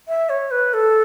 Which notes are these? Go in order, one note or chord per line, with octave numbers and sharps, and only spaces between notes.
E5
C#5
B4
A4